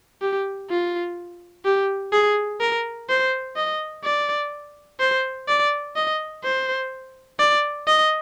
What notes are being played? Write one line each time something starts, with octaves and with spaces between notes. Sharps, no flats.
G4
F4
G4
G#4
A#4
C5
D#5
D5
C5
D5
D#5
C5
D5
D#5